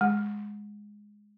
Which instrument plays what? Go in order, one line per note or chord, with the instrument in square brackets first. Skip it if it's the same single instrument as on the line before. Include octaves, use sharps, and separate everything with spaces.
[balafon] G#3